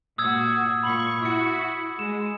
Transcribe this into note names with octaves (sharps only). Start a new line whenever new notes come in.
A#2 F#4 D#6 E6 G#6
A#2 B5 C#6 F#7
E4 F#4 E6 C#7
G#3 E7